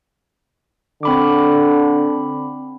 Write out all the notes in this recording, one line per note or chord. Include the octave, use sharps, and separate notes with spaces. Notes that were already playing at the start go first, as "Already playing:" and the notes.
D3 C4 B5 D6